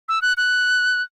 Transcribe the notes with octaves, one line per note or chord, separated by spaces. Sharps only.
E6
F#6
F#6